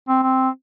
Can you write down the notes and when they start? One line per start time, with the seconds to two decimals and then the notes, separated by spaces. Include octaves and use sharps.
0.08 C4
0.23 C4